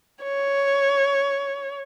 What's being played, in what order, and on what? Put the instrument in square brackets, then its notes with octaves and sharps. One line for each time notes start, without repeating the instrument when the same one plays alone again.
[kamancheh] C#5